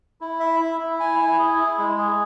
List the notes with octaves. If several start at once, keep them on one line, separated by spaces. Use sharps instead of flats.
E4
E5
E4
E4
G#5
E4
G#4
E4
G#3
G#4